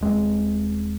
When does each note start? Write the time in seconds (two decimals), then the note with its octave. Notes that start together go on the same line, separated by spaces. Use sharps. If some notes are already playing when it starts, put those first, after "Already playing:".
0.01 D#1 G#3 A#3 C4